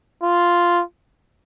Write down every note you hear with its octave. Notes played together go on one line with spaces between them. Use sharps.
F4